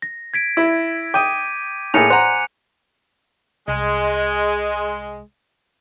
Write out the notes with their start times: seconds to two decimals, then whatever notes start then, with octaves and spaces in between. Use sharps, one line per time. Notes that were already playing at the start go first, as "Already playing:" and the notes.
0.02 A#6
0.34 G#6 B6 D7
0.57 E4
1.14 G5 D6 D#6 G6 D#7
1.94 A2 A#3 G#4 G#5 C#7 F7
2.10 C5 F#5 A#5 F#6
3.68 C2 G#3